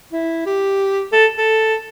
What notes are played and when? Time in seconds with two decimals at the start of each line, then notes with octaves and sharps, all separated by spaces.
0.12 E4
0.46 G4
1.12 A4
1.38 A4